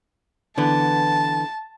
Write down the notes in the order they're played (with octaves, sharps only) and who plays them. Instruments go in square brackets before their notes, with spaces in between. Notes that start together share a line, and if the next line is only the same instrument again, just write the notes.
[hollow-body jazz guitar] D3 E3 B3 [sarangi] A5